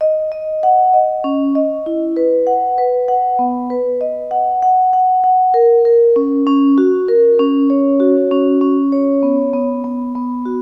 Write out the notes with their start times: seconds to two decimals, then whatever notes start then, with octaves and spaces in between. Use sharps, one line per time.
0.01 D#5
0.32 D#5
0.63 F#5
0.93 D#5
1.24 C#4
1.55 D#5
1.86 E4
2.16 B4
2.47 F#5
2.78 B4
3.08 F#5
3.39 B3
3.70 B4
4.01 D#5
4.31 F#5
4.62 F#5
4.93 F#5
5.24 F#5
5.54 A#4
5.85 A#4
6.16 C#4
6.47 C#4
6.78 F#4
7.08 A#4
7.39 C#4
7.70 C#5
8.00 F#4
8.31 C#4
8.61 C#4
8.92 C#5
9.23 B3
9.53 B3
9.84 B3
10.15 B3
10.46 F#4